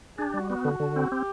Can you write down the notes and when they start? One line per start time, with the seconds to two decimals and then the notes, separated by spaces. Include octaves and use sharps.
0.18 D4 G#4
0.28 G4
0.34 G3 F#4
0.49 B3 F#4
0.65 D3
0.80 D3
0.96 C4
1.11 C4 G4